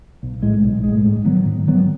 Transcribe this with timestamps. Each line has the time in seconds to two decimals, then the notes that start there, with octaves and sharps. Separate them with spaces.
0.23 B1
0.42 A2 G#3
0.64 B1
0.84 A2 G#3
1.05 G#2
1.25 D#3 F#3 B3
1.45 G#2
1.67 D#3 F#3 B3